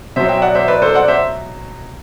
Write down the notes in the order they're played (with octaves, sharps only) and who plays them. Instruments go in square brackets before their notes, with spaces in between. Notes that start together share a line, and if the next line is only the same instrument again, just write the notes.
[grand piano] B2 F#3 C5 E5
E5 G5
D5 F#5
C5 E5
B4 D5
A4 C5
D5 F#5
C5 E5